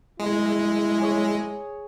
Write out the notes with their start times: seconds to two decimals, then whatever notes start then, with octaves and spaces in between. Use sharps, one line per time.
0.19 G#3 E4
1.00 G#4 C#5